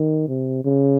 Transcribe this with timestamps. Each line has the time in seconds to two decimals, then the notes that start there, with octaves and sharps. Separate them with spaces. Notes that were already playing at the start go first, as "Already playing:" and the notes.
Already playing: D#3
0.28 C3
0.64 C#3